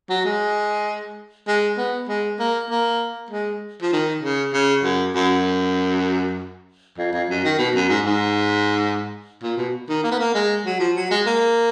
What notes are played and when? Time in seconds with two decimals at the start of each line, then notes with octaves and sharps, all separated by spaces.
0.09 F#3
0.25 G#3
1.48 G#3
1.77 B3
2.08 G#3
2.39 A#3
2.70 A#3
3.30 G#3
3.82 F3
3.92 D#3
4.22 C#3
4.53 C#3
4.83 F#2
5.15 F#2
6.98 F2
7.13 F2
7.29 F#2
7.44 D#3
7.58 B2
7.75 F#2
7.89 G#2
8.05 G#2
9.42 A#2
9.57 B2
9.89 D#3
10.04 A#3
10.11 B3
10.19 A#3
10.34 G#3
10.66 F#3
10.80 F3
10.96 F#3
11.11 G#3
11.26 A#3